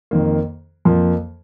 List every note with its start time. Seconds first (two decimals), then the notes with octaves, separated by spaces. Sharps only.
0.11 F2 D#3 A#3
0.85 F2 F3 A#3